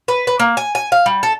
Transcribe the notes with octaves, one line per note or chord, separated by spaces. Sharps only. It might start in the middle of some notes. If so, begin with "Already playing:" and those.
B4
B4
A#3
G#5
G#5
F5
G3
A4